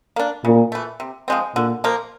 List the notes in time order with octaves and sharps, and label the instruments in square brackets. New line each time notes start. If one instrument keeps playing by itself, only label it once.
[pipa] A#3 D4
[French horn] A#2 [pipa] C#3
[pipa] E3 A3
C3
F3 G#3 C4
[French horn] A#2 [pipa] D3
[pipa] F3 A#3